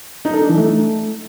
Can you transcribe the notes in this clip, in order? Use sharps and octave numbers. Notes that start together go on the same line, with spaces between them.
D#4
A4
D4
E3
A3